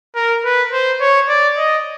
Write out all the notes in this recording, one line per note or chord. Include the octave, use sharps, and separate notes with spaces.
A#4
B4
C5
C#5
D5
D#5